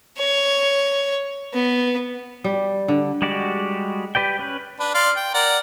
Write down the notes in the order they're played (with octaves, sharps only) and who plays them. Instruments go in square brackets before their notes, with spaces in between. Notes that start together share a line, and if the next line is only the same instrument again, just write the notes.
[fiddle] C#5
B3
[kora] G3
D3
[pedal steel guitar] G3 G#3 F#4 G4 D5
G4 B4 D5 G5
C#4 B4
[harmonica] D4 B4
D5 F5 C6
G5
A#4 D5 F#5